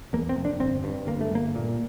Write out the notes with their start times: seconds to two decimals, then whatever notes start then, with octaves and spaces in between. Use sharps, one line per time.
0.13 E2 A#3
0.29 C4
0.36 F1
0.45 D4
0.60 G1 C4
0.84 G2
1.07 G1 A#3
1.21 A3
1.32 G1 A#3
1.55 A#2